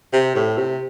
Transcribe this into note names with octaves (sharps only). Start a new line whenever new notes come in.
C3
A2
C3